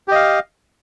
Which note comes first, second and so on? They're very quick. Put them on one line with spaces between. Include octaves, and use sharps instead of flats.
G4 D#5 F5